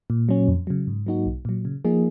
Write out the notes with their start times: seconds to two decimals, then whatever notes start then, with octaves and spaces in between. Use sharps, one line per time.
0.10 A#2
0.29 F#3 C#4
0.48 F2
0.67 C#3 F#3
0.87 G#2
1.07 F#3 A#3 D#4 F#4
1.26 B1
1.45 A#2 F#3
1.65 C#3
1.85 F3 A#3 D#4 G#4